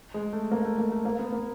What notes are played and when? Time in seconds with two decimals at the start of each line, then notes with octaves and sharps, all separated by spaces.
0.14 G#3
0.33 A3
0.51 A#3
0.65 A3
0.78 A#3
0.91 A3
1.05 A#3
1.19 B3
1.32 A#3